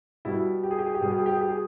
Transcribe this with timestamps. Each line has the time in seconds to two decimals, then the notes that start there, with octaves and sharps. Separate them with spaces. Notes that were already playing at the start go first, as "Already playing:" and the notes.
0.25 B2 G3 E4
0.63 G4
0.71 G#4
0.79 G4
0.86 G#4
0.95 G4
1.01 B2 G3 G#4
1.10 G4
1.18 G#4
1.26 G4
1.33 G#4
1.41 G4
1.49 G#4